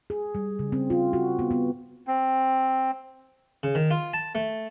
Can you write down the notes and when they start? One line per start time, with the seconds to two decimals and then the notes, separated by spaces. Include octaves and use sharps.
0.10 G#4
0.35 G3
0.59 C#3
0.72 C4
0.90 F4
1.13 F#4
1.39 B3
1.51 B3
2.07 C4
3.63 C#3
3.75 D#3
3.91 F4
4.13 A5
4.35 A3